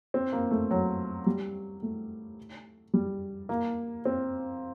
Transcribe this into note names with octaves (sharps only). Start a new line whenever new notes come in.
C4
A#3
A3
F#3
G3
A3
G3
A#3
C4